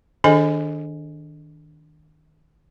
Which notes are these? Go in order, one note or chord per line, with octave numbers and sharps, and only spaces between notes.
D#3 D4 G#4 A4 D#5 G#5